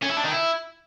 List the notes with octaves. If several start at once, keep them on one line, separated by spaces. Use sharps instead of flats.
C#4
E4
D4
D#3
E4